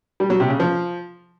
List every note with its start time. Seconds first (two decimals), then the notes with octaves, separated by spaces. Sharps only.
0.20 G3
0.30 F#3
0.40 C3
0.50 C#3
0.60 F3